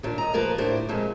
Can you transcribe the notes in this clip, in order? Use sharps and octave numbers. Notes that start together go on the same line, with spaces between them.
D#2 A#2 D4
D#5 A#5
F#2 F3 A#3 A#4 B4
A2 D4 E4 C5
F2 A#2 F3 G#3